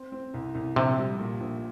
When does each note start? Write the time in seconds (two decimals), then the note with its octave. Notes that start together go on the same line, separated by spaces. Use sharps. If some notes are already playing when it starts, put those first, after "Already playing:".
Already playing: C4
0.12 C4
0.34 C2
0.55 C2
0.76 A#1 C3
0.98 G3
1.19 A#2
1.40 A#1